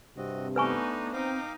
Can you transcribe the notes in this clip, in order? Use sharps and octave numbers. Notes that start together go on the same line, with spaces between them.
G2 C3 C4 F#4 D#5
A3 B3 D4 D#4 B4 G#5 C#6
C4 D#4 F5 G5 D6